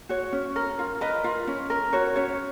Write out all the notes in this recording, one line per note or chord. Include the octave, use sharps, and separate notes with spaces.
F#4 C#5
C#4
A#4
F4
A#4 B4 D#5
F4
C#4
A#4
F#4 C#5
C#4 C#5